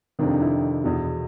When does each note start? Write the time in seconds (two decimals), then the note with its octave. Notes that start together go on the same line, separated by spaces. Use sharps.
0.19 F2 C3 D#3 D4
0.40 E4
0.84 E2 B2